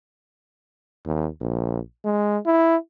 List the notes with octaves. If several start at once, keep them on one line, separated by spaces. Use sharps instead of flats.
D#2
A#1
G#3
E4